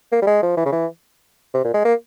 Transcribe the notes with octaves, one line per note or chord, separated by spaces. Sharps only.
A#3
G3
G#3
F3
E3
C#3
E3
C3
A#2
G#3
A#3